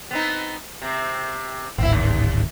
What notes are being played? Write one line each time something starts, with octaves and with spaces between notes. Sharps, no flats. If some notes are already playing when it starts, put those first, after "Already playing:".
B3 C4 D#4
C3 C4
D1 G#1 C4 E4
D#2